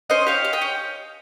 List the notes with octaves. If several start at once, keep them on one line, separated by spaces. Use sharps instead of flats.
C#4 C5 D#5
G4 C#5 F5
G4
D#5 G5
C#4